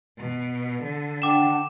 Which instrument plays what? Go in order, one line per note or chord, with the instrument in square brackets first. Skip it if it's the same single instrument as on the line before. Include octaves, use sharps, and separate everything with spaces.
[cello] B2
D3
[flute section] D4 F#5 G5 [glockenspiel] D6 E7